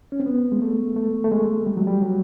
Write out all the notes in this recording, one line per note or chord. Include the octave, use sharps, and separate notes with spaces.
C#4
C4
B3
G#3
A3
A3
A3
G#3
G3
F#3
G3
F#3